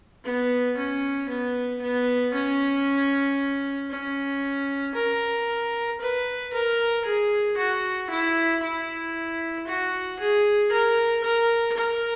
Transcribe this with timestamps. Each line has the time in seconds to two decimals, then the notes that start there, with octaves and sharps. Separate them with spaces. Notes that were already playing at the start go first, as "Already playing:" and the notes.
0.24 B3
0.77 C#4
1.29 B3
1.82 B3
2.34 C#4
3.91 C#4
4.95 A#4
6.01 B4
6.53 A#4
7.05 G#4
7.57 F#4
8.11 E4
8.63 E4
9.67 F#4
10.19 G#4
10.72 A#4
11.24 A#4
11.77 A#4